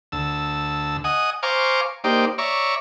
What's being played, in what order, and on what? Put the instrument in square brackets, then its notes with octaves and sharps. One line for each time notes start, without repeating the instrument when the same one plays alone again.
[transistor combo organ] D2 A5 E6
D#5 F#5 G#5 D#6
C5 F5 G#5 A#5 C#6 D6
A#3 D#4 G4 C5 D5
C#5 D5 E5 A#5 C#6